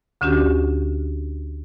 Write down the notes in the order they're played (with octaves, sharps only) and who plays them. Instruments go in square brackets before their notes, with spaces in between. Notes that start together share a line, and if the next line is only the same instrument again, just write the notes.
[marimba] D2 D3 C#4 D4 F#4 G4